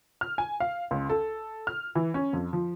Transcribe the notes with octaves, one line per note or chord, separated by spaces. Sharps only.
F6
G#5
F5
C#2
A4
F6
E3
C#4
F2
F3